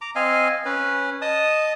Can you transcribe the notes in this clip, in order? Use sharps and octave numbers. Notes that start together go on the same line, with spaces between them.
A#5 D6
C4 D#5 F5 G#5
C#4 B4
D#5 A5 D#6